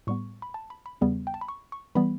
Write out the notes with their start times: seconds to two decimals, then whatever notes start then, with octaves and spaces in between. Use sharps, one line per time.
0.07 A2 G3 B3 C#6
0.42 B5
0.54 A5
0.70 B5
0.86 B5
1.01 E2 C#3 G3 B3
1.27 G5
1.34 A5
1.41 B5
1.48 C#6
1.72 C#6
1.95 E3 G3 B3 B5